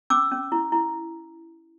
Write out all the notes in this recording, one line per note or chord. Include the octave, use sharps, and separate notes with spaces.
C#4 D6 E6
C#4
E4
E4